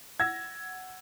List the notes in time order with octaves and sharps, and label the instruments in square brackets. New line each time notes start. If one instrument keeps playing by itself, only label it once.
[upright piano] F#5 E6 A#6 [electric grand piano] G#6